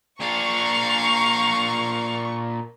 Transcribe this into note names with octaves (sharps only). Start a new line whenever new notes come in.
A#2 D4 F5 A#5 C#6